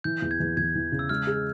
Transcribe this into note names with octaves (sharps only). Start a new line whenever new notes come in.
E3 G6
E2
G#6
E2
E2 G#6
E3
C#3
E6
G#3 F6
G#4